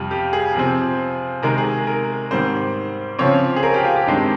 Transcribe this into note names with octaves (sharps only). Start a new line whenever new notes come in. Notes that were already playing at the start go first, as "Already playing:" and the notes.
Already playing: F2 C3 G3
G4
G#4
C3 F3 C4
C3 D#3 G#3 A#4
G#4
A#4
G#2 D#3 G3 C4 C5
C#3 F3 C4 C#5
G#4
A#4
G4
F4
G4
G2 D#3 G#3 C4